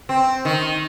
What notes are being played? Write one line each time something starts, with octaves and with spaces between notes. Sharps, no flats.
C4
D#3